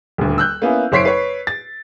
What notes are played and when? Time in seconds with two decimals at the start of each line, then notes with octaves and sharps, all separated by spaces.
0.18 D#1 D2
0.38 E6 F#6 G6
0.62 A#3 B3 C#4 E4
0.92 F#1 C5 C#5 B6 C7 D7
1.05 B4 C#5
1.47 A6